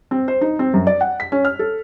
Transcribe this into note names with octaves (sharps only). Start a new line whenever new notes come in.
C4
C5
D#4
C4
F#2
D5
F#5
B6
C#4
F6
A4